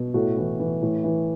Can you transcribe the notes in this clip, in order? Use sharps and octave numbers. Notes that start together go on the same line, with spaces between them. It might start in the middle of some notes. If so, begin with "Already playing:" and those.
Already playing: B2
A2 F#4 A4
E3
E3
A2
E3